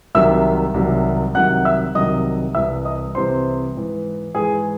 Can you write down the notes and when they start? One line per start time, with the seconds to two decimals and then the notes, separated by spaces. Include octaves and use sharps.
0.15 C2 C3 D#3 F#3 E5 E6
0.74 C2 C3 D#3 F#3
1.35 C2 C3 D#3 F#3 F#5 F#6
1.65 E5 E6
1.95 C2 C3 D#3 F#3 D#5 D#6
2.55 C2 C3 E3 E5 E6
2.85 D#5 D#6
3.15 C2 C3 E3 C5 C6
3.75 G#2 E3
4.35 G#2 E3 G#4 G#5